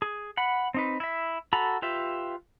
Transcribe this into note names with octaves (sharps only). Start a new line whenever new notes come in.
G#4
F#5 B5
C4 D#4 B4
E4 E5
F#4 A4 A#5 B5
F4 G4 B4 E5